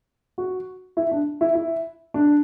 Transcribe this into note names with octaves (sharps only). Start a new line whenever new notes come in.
F#4
E4
D4
E4
E4
D4